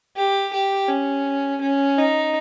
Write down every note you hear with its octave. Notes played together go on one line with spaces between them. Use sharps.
G4
G4
C#4
C#4
D#4